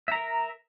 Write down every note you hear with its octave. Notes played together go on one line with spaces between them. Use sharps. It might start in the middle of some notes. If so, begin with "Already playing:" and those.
A#4 E5 A#5